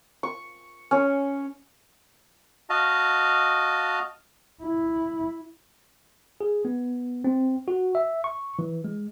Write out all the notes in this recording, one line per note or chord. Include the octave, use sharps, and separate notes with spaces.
C#6
C#4 C#5
F#4 D#5 F5 A5
E4
G#4
B3
C4
F#4
E5
C#6
E3
G#3